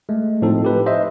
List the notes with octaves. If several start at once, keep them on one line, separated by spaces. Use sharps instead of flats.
G#3 A3
A2 F3 C4 D#4 A4
G4 B4
C5 D#5 E5